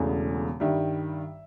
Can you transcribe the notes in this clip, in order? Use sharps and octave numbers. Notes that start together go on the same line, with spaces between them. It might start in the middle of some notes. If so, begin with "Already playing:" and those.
Already playing: E1 E2 C#3 E3 A3
G2 D#3 G3 E5